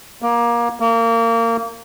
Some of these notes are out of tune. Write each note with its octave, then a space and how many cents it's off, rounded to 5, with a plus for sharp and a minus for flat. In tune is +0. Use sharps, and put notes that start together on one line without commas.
A#3 +20
A#3 -25